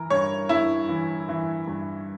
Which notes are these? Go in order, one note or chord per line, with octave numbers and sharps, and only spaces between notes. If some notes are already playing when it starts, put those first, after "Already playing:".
Already playing: E3 A#4
G2 C#5
G2 E4
E3
E3
G2